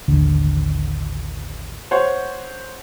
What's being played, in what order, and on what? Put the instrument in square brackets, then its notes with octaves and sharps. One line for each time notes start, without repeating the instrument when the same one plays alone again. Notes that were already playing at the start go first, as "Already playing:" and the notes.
[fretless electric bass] A1 D#2 D3
[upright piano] C5 C#5 F#5